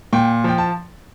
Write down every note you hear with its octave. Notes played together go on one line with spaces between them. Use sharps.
A#2 G5
F3 G5
A5